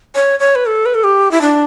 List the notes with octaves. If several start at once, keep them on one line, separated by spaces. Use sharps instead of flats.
C#5
C#5
B4
A4
B4
A4
G4
E4
D4